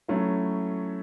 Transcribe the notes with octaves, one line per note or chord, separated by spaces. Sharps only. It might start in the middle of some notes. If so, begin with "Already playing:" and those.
F#3 A3 C#4 E4